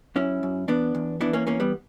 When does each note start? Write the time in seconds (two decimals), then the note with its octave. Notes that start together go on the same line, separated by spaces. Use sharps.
0.16 F#2 C#4 E4
0.43 F#2
0.68 E2 B3 D4
0.95 E2
1.21 E3 B3 D4
1.33 A#3 C#4
1.47 E2 A#3 C#4
1.60 G3 B3